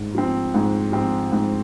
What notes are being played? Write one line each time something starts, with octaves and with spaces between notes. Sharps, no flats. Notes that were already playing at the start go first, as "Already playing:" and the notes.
Already playing: G#2
F3 C4
G#2
F3 C4
G#2